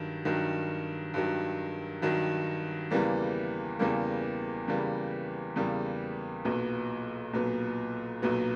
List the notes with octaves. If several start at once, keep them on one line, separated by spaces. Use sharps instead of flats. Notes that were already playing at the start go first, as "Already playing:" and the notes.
Already playing: G2 D#3 F#3
G2 D#3 F#3
G2 D#3 F#3
G2 D#3 F#3
E2 C#3 E3 G3 A#3
E2 C#3 E3 G3 A#3
E2 C#3 E3 G3 A#3
E2 C#3 E3 G3 A#3
B1 A#2 F#3 B3
B1 A#2 F#3 B3
B1 A#2 F#3 B3